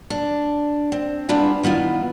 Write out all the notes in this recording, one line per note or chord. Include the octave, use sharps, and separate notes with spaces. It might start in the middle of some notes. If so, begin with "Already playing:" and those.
D4
C4
G3 B3 D4 E4 F4 G#4
D#3 B3 E4 F4